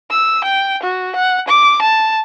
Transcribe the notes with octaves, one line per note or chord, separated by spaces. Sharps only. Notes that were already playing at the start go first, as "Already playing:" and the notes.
E6
G5
F#4
F#5
D6
A5